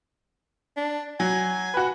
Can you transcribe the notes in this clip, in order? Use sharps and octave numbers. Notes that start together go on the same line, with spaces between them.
D4
F#3 G#5
F#4 B4